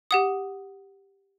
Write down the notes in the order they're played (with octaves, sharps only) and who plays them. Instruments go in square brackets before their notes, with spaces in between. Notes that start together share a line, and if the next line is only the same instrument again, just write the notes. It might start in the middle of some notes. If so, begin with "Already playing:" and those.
[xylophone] G4 F#5 D#6